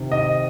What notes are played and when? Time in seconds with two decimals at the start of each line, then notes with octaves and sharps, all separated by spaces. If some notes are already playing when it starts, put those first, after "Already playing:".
Already playing: C3 D#3
0.12 D#5